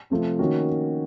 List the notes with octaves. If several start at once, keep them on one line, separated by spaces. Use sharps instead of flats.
C3 F3 A3
D#3 A#3 C#4 F#4